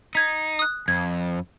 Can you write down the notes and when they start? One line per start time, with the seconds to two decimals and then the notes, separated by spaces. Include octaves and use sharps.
0.15 D#4 G#6 B6
0.59 D#6 F#6
0.88 F2 G#6